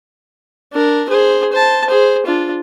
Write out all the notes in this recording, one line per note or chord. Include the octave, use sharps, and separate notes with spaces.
D4 A#4
G#4 C5
C5 A5
G#4 C5
D4 F4